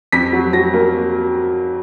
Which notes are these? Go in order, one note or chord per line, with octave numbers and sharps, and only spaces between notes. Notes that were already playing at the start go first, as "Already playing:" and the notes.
F2 B6
F#3
F#3 A#6
A#3